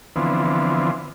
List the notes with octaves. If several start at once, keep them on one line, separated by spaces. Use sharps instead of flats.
D3 E3 F3 B3 C4